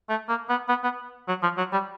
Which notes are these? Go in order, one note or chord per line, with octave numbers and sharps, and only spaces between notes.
A3
A#3
B3
B3
B3
F#3
F3
F#3
G3